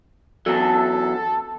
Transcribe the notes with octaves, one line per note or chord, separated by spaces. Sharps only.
E2 F#3 A4